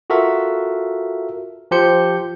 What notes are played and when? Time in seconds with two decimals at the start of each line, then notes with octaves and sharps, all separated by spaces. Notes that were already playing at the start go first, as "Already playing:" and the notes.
0.10 F4 F#4 A4 A#4 E5
1.71 F3 G4 C5 G6 C#7